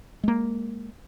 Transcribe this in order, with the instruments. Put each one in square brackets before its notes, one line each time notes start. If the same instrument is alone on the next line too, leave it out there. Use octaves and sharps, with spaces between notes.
[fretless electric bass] G#3 A#3